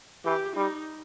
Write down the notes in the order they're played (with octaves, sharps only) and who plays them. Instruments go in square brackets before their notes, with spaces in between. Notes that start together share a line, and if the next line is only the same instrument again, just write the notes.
[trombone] E3 [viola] G4
[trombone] G3 [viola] D#4